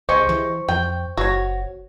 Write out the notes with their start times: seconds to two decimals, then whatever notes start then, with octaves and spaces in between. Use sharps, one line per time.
0.09 C#2 G#3 G4 C5 C#6
0.29 E3
0.69 F2 G5
1.17 F#1 F#4 C#5